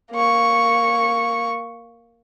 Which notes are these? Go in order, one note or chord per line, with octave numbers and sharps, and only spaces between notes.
A#3 C#6